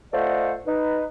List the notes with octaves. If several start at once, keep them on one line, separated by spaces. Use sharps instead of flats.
A3 F4 C5 D5 D#5 F#5
D#4 B4